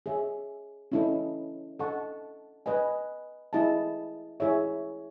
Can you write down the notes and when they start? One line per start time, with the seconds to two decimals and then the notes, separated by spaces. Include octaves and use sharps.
0.06 G#4 C#5 E5
0.92 C#4 E4 A4 D#5
1.79 A4 D#5 F#5 A5 C#6
2.66 B4 D#5 G#5
3.53 E4 G#4 D#5 A5
4.40 E4 G#4 C#5 E5